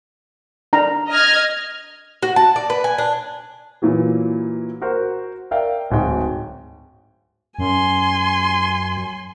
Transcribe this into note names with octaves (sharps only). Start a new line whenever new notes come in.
D4 A#5
D#5 F6 G#6
F#4
A5
D5
B4
G#5
D4
A#2 E3 F#3
F#4 A#4 C5
A#4 D5 E5 F5 G5
D1 G#2 F#3 F#4 G5
F#2 G#5 C6